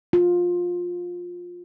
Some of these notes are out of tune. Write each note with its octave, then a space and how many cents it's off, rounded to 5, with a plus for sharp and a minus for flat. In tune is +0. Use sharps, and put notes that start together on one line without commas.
F4 +15